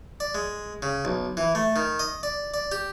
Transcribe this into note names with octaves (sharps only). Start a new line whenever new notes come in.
D5
G#3
C#3
B1
E3
A3
D#3
D#5
D5
D5
G4